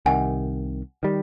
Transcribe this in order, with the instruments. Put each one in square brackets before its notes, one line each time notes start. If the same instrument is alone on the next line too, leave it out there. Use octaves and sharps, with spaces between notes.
[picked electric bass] C2 C3 D#3 [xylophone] F#5 G#5
[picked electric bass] D#3 G3